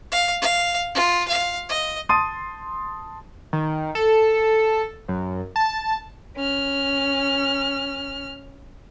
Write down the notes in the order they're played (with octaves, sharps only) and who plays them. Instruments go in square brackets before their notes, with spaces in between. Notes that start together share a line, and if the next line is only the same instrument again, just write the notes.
[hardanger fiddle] F5
F5
F4
F5
D#5
[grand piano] A5 C6 D#6 A6 D#7
[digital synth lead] D#3
A4
F#2
A5
[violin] C#4 F6